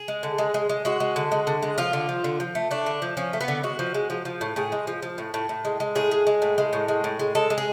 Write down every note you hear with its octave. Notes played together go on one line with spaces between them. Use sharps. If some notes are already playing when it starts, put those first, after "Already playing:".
Already playing: G#4
G#3
D3
G#3
G#3
G#3
G#3 F#4
G#3
D3
G#3
D3
G#3
F3 F4
D3
F3
D3
F3
A3
A3 D4
D3
F3
F3 C#4
A3
B3
D3
G#3 F#4
F3
G#3
F3
F3
A2
A2 G#4
G#3
F3
F3
A2
A2
A2
G#3
G#3
A2 G#4
G#3
G#3
A2
G#3
A2
G#3
A2
G#3
G#3 A4
G#3
G#4